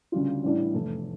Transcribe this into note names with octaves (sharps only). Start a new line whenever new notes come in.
D2 C#3 G3 C#4 F4
A1 A2 E3 G3 D4
F1 E2 E3 A3